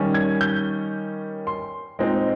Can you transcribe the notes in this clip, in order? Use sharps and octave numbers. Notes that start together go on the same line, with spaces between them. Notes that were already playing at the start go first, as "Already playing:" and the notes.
Already playing: D#3 G3 C#4
G#6
G6
C6
A#2 G#3 C4 D#4